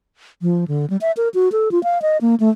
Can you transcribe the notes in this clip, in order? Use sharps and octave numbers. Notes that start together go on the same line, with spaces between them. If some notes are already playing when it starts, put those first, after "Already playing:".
F3
D3
G3
E5
A#4
F#4
A4
F4
F5
D#5
A#3
A3